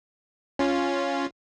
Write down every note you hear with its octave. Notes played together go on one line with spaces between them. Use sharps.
C#4 F4